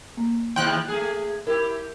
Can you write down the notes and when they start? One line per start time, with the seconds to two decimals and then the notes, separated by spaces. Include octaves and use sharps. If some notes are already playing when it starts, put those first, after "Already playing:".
0.17 A#3
0.56 D#2 C3 F3 G5 C6 F#6
0.88 A3 G#4
1.47 E4 G4 A#4